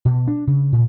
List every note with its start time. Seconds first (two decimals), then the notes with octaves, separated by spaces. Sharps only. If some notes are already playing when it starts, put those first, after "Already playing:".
0.05 B2
0.28 D4
0.47 C#3
0.72 A#2